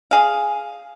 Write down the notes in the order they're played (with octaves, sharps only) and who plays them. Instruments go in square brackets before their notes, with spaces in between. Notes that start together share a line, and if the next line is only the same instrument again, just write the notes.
[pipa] G#4 F5